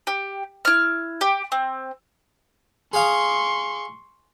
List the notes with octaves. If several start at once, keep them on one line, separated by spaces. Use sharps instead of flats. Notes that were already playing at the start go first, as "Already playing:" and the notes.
G4
E4 F6
G4
C4
G#4 F5 C6 C#6 D#6